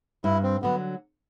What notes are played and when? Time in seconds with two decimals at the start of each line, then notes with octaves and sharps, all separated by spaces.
0.24 G2 E4
0.43 C4
0.62 D3 F#3 B3